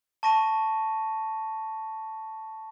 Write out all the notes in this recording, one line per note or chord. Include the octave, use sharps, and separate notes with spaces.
A5 C#6 A#6 D#7